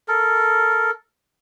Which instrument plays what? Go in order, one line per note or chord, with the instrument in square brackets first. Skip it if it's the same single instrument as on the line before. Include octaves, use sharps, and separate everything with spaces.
[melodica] A4 A#4